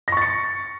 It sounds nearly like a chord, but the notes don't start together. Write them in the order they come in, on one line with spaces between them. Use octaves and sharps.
A#6 C#6 A6 C#7